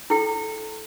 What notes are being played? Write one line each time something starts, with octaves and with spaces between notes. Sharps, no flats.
E4 A4 G5